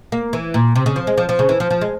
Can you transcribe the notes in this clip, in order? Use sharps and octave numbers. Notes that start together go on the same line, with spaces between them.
A#3
E3
A#2
C3
C#3
F3
G#3
F3
F3
C#3
E3
F3
F3
G#3